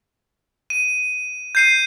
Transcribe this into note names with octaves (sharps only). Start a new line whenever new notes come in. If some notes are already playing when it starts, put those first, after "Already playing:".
D#7
G6 C7 D#7